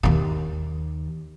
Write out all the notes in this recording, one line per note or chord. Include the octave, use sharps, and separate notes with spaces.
D#2 D#3